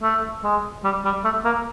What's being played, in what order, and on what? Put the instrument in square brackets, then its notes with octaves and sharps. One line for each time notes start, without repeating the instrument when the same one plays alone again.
[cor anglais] A3
G#3
G3
G3
A3
A#3